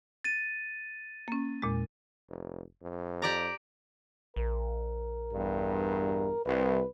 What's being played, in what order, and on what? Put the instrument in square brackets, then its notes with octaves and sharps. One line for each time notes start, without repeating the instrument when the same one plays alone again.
[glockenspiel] A6 D#7
[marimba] A#3 C#4
E2 A#2 G#3
[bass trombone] F1
F2
[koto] G4 D5 A#5
[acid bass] A#1 [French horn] A#4
[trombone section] E2 G2
[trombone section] C2 [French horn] B4